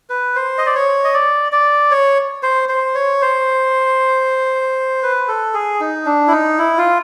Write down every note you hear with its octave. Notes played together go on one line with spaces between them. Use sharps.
B4
C5
D#5
D5
C#5
D#5
D5
D5
C#5
C5
C5
C#5
C5
B4
A4
G#4
D#4
D4
E4
D#4
E4
F4